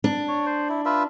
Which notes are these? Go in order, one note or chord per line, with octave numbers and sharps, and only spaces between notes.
D4
C#5
C5
E4
F4 B4 E5